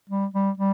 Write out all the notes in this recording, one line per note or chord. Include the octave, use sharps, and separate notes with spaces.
G3
G3
G3